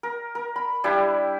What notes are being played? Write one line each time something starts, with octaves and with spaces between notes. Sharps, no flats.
A#4
A#4
B5
G3 D4 E4 G4